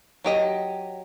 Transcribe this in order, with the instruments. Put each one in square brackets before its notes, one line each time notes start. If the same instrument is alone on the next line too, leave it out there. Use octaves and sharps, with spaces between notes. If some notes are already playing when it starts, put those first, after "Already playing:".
[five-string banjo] F#3 G4 D#5